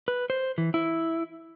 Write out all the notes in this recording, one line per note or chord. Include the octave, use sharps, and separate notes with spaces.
B4
C5
E3
E4